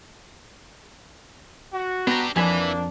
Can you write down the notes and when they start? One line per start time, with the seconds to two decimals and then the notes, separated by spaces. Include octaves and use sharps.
1.73 F#4
2.07 B3 D4 G4 A#5
2.36 F2 E3 F3 A#3 D4 G#5 B5